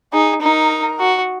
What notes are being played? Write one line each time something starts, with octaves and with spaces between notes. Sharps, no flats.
D#4 G#4
D#4 A#4
F#4